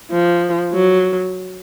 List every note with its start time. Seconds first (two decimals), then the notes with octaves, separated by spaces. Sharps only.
0.12 F3
0.73 F#3